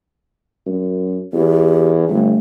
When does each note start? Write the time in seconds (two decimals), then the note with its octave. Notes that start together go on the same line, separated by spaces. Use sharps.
0.66 F#2
1.33 E2 G4
2.08 G1 A3